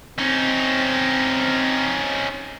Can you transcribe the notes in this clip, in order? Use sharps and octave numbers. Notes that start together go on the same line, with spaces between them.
C4 C#4 D#4